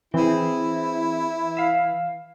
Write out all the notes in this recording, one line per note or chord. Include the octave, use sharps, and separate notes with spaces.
E3 C4 E4 G#4
E5 F5